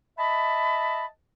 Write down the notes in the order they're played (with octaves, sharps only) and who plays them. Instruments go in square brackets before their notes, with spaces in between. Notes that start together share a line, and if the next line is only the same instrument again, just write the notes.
[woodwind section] D#5 E5 A5 B5